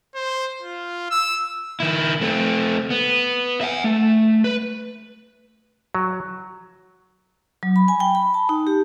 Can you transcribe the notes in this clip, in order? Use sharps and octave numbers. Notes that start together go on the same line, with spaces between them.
C5
F4
E6
D#3 E4
A3 C4
B3
E5 F#5
A3
B4
F#3
F#3
B5
G#5
G5
B5
A5
D#4
G4